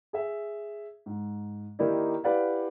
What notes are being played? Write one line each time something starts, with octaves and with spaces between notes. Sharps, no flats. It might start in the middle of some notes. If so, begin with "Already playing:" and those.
G#4 E5
G#2
D#3 A#3 D#4 E4 G4 D5
E4 G4 B4 D5 F5 F#5